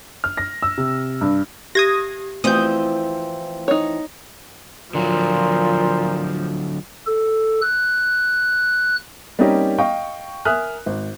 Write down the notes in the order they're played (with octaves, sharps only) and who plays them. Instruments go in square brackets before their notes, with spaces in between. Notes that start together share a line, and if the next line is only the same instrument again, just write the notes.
[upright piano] F6
A#6
E6
C3
G2
[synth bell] G4 [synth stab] D#6 G#6 A#6
[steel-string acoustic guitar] E3 F3 C4 [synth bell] A3 [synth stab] D#6 G6
[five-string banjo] D#4 C#5
[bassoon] A#2 [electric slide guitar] D3 F#3 [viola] F3
[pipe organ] A4
F#6
[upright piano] G3 A#3 C4 C#4 D#4 G4
D#5 F5 G5 C#6
A#4 E5 G#5 D#6 F6 F#6
G#1